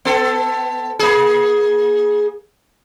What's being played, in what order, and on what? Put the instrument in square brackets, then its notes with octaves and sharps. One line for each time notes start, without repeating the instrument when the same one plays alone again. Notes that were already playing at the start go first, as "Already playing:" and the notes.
[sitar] B3 A4
A#3 G#4